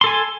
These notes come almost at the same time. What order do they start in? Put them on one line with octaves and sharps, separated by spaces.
C6 A4 G#5